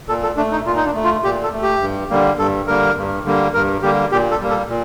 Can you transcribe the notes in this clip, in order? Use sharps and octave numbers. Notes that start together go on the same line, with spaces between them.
A#2 A4
A4
A3 D4
D#4
A#2 F4
D#4
D4
A3
F4
A#2 G4
A4
A3
G4
G2
D3 G3 A#3
G2 A4
D3 G3 A#3 A#4
G2
D3 G3 A#3
G2 A#4
D3 G3 A#3 G4
A#2 G4
A4
G3 A#3
A4
A#2